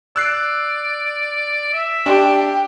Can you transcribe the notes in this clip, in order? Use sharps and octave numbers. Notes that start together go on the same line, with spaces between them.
D5 E6 F#6 C7
E5
D4 G4